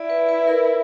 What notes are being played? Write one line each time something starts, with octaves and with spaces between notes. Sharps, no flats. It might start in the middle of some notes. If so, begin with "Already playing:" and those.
Already playing: E4 D5
B4
B4
A#4